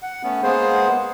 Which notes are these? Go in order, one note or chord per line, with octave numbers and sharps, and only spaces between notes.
F#5
A3 B3 C#4
G#3 A#3 B3 G#4 C5